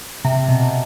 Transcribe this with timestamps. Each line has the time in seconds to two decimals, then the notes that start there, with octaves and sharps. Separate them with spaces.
0.25 C3
0.48 B2